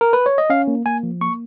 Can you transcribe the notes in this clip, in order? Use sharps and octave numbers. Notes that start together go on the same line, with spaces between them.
A#4
B4
C#5
D#5
C#4 F5
A#3
A#3 G#5
F3
A#3 C#6